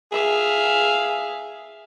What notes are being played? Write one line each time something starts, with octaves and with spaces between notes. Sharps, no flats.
G#4 E5 F5